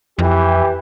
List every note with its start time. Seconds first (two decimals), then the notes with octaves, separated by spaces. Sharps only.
0.19 F2 E3 G4